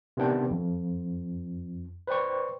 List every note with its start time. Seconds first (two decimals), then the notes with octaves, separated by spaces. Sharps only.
0.17 C3 D#3 B3 D4 G5
0.51 F2
2.07 B4 C5 D5 G5 C#6